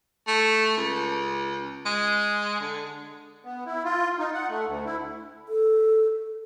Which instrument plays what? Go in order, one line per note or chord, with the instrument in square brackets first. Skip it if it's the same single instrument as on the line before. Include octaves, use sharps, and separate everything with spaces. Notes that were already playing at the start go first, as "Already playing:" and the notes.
[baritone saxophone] A3
C#2
G#3
D3
[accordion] B3
E4
F4
D#4
F#5
A3
D2
E4
[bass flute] A4